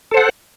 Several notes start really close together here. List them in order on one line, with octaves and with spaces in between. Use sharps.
A4 C5 F#5